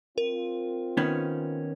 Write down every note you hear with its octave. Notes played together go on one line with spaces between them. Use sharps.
C4 F4 A#4
D#3 B3 C#4